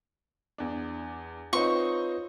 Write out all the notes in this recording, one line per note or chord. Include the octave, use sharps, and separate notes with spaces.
E2 D4
C4 D#4 F4 B4 C#5 C#6